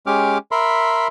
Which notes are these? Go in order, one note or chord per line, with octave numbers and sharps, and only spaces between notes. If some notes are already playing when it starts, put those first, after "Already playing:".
G#3 C#4 G4 D6 F6
A#4 E5 B5 C6